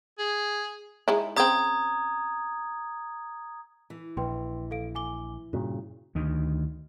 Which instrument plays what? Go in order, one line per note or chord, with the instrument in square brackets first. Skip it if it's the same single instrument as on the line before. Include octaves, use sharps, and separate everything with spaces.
[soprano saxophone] G#4
[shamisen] G#3 D#4 E4
[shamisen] C#3 C4 [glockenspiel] A#5 D#6 G#6
[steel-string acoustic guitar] E3
[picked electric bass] A#1 [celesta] B4 G5 C6
[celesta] A4 F5 D7
G#5 D6 G7
[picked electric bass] G2 A#2 C#3 [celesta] F#4
[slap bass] D2 D#3